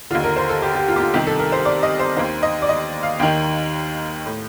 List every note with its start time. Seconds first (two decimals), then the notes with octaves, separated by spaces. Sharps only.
0.11 D3 F4
0.15 D#2
0.24 A#4
0.36 C5
0.49 A4
0.62 G4
0.75 G4
0.88 F4
0.96 G4
1.00 F4
1.14 C2 C3 D#3 G4
1.27 A4
1.39 A#4
1.52 C5
1.65 D5
1.83 D#5
1.99 C5
2.17 D#2 D#3 C5
2.43 D#5
2.62 D5
2.69 D#5
3.03 F5
3.19 D#2 D#3 G5
4.26 A2